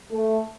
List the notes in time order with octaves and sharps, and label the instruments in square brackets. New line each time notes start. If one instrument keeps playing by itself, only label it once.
[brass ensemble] A3